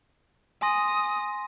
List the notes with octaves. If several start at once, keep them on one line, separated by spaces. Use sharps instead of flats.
G#5 C6 D#6 A#6